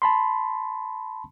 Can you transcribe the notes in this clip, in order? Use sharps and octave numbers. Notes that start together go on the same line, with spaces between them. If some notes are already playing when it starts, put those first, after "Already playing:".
A5 B5 C6